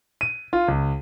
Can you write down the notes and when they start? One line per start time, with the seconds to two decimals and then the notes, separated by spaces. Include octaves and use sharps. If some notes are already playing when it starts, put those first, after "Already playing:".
0.21 D#7
0.53 F4
0.68 C#2